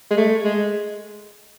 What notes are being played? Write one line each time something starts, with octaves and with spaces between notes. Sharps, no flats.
G#3
A3
G#3